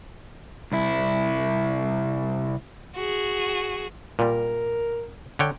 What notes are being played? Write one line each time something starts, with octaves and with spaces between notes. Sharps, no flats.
C2 E4
F#4 G#4
A#2 G3 A#4
D3 C#5 G5